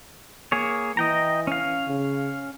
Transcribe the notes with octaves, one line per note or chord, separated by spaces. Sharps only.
A#3 G#4 C#5
E3 D#5 G5 A#5
C#4 F5
C#3